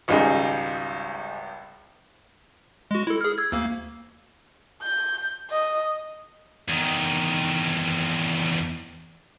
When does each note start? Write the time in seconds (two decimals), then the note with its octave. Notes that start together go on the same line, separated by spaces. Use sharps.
0.08 G#1 C#2 G#2 G3 D#4 G#4
2.91 G#3 F#4
3.07 E4 A4
3.21 G#4 F6
3.38 E6 G#6
3.52 D2 A#3
4.82 G6
5.50 D#5
6.68 E2 D#3